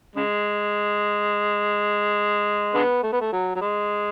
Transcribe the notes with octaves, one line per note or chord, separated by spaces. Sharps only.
C#3 G#3
D3 G#3 B3
A3
B3
A3
F#3
F#3
G#3